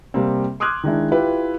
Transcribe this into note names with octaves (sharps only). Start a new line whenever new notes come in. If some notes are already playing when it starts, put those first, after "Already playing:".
C3 G3 A#3 C4
C6 D6 D#6 F6 F#6 G#6
D#3 G#3 D4 E4
E4 F4 G4 B4